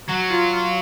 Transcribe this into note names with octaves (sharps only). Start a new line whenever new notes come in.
F#3 F#4
F4
F4